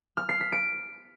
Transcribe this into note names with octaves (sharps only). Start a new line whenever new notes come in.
F6
C7
B6
D7